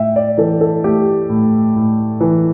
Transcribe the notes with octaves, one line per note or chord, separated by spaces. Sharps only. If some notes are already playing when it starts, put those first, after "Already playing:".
Already playing: A2 E5 G5
D5
E3 A4
A4
A3 G4
A2
A2
E3